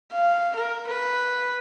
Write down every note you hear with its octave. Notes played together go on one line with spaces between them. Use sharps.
F5
A#4
B4